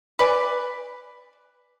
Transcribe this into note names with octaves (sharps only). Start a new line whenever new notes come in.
B4 D5 G#5